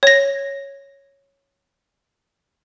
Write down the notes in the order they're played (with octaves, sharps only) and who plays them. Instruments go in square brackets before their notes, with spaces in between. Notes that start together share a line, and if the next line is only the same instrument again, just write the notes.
[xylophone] C#5 A#6